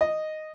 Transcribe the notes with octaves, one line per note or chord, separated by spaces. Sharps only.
D#5